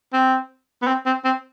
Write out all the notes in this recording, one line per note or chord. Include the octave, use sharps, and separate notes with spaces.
C4
B3
C4
C4
C4